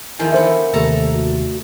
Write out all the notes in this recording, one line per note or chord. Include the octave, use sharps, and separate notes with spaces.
E2 D#3 F3 E4 G#5
D3 B3 A#4 C5 E5
D#2 C3 A3 A4 A5 A#5
F#4